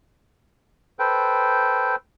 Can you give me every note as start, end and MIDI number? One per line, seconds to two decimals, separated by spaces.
0.99 1.96 69
0.99 1.96 71
0.99 1.96 72
0.99 1.96 79